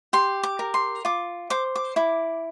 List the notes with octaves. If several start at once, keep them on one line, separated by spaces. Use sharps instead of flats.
G4 C6
D6
A#4
C6
F4 D6
C5 D6
D6
E4 D6